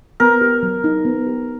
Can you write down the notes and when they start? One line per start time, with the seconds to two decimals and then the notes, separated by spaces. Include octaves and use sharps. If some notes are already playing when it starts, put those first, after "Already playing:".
0.20 B3 A#4
0.41 G4
0.63 F#3
0.84 D#4
1.05 B3
1.27 G4